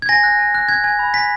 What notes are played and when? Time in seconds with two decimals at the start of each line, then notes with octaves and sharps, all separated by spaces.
0.02 G#6
0.09 G#5 A#6
0.23 F#6
0.39 G#5
0.54 F#6
0.68 F#6 G#6
0.84 G#5 G#6
0.99 B5
1.14 G#5 B6